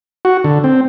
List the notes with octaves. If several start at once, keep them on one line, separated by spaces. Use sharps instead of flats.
F#4
D3
C4